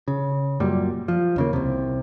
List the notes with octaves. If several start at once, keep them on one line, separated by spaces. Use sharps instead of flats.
C#3
F#2 A#2 G3
F3
D#2 C#3 A#3
C2 C3